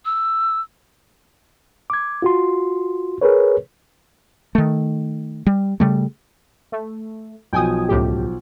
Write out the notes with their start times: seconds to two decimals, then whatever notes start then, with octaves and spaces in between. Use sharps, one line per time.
0.05 E6
1.90 D6 G#6
2.22 F4 F#4 C6
3.21 G#4 A#4 B4 C#5
4.55 D#3 A3
5.47 G3
5.80 C#3 G3 A3
6.72 A3
7.53 B1 F3 G5 G#5 D#6
7.89 C#2 A2 G4